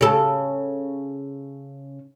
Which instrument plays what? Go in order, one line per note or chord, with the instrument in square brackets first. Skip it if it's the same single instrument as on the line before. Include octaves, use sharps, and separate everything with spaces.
[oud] C#3 A4